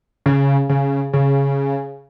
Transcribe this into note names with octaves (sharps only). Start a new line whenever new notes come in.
C#3
C#3
C#3